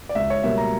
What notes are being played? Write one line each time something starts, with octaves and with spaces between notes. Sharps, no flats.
D5
C#2 E5
C#5
B2 G3 A#3 E5
A#5